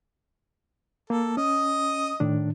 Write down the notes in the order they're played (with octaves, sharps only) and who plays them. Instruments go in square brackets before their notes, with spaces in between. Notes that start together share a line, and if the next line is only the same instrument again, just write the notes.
[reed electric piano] A#3 [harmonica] A4
[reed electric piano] C#4 [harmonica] D#5 D#6
[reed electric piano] A2 D#3 D4